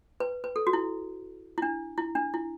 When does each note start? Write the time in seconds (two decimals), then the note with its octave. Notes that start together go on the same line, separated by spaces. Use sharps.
0.20 B4
0.44 B4
0.56 A4
0.67 F#4
0.73 E4
1.58 E4
1.62 D4
1.98 E4
2.15 D4
2.34 E4